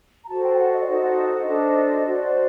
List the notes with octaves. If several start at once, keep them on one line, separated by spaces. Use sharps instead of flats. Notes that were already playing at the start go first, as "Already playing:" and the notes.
A#5
F#4 A4 C5 A5
G5
G5
F#5
D#5
D5
D#4 F#4 A4 C5 D#5
F#5
F#5
D#5
D4 A4 C5
F#4 C5 D5